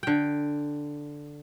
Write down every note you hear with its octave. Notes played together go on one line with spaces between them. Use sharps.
D3 G5